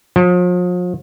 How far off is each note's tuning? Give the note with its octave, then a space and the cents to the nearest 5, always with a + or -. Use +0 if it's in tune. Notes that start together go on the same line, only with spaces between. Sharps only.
F3 +40